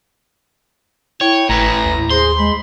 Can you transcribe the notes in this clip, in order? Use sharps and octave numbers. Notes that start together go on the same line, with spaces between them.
E4 C#5 G5
G#1 A2 B4 A#5
D#2
G#4 C5 C6
G#3 B5